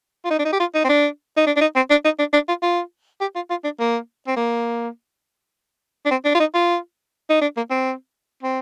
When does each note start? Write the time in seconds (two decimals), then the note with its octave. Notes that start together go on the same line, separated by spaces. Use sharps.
0.25 F4
0.30 D#4
0.39 D4
0.45 D#4
0.52 G4
0.60 F4
0.75 D#4
0.84 C4
0.89 D4
1.37 D#4
1.46 D4
1.56 D4
1.61 D#4
1.76 C4
1.90 D4
2.04 D#4
2.19 D4
2.33 D4
2.48 F4
2.62 F4
3.21 G4
3.35 F4
3.50 F4
3.64 D4
3.79 A#3
4.27 C4
4.36 A#3
6.05 D4
6.11 C4
6.25 D4
6.35 F4
6.40 D#4
6.54 F4
7.30 D#4
7.41 D4
7.56 A#3
7.70 C4
8.43 C4